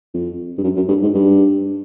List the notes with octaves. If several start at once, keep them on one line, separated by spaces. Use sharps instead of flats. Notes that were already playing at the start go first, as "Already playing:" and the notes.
F2
G2
F#2
F#2
G2
G#2
G2